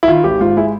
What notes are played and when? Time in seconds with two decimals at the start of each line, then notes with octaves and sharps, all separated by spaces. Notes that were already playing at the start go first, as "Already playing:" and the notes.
0.03 E4
0.08 D#3 F4
0.24 G#1 G4
0.41 G#2 F4
0.57 G#3 E4